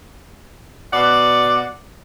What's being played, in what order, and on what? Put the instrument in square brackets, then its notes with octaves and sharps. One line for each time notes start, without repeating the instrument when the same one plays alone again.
[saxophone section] B2 D5 F#5